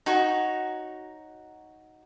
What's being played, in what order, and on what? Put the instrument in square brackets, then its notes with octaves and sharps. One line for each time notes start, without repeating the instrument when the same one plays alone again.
[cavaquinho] D#4 F#4 C#5